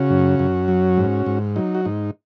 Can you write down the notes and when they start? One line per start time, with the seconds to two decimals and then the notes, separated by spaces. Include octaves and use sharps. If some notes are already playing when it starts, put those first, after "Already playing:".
Already playing: C#3 C#4 F#4
0.10 F#2
0.39 F#2
0.68 F#3
0.97 G#2
1.26 G#2
1.56 F#3 D#4
1.75 F#4
1.85 G#2 D#4